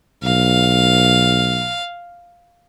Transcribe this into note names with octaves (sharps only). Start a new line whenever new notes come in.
B1 F5